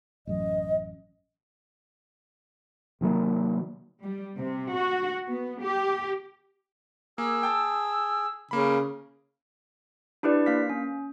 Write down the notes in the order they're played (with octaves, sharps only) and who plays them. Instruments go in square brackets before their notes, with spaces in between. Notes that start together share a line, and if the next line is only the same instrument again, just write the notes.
[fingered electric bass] A1 F#2 [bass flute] D#5
[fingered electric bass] C3 D#3 F#3 A#3
[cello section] G3
C3
F#4
B3
G4
[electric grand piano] A#3 [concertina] G#4 [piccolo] E6
[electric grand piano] G5 A5
[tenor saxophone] C#3 [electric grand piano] A#3 B5
[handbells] D4 E4 G4 B4 D5
A#3 F5 F6 B6
C#4